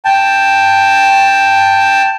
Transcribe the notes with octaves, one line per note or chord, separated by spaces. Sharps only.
G5 A5